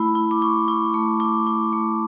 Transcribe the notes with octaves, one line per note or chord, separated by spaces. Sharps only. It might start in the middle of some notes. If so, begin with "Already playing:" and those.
Already playing: A3 E4 B5
E4
D6
E4 C#6
E4
A3
E4 D6
E4
A3